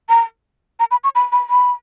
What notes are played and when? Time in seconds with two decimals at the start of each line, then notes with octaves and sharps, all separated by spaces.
0.09 A#5
0.80 A#5
0.91 B5
1.04 C#6
1.15 B5
1.32 B5
1.50 B5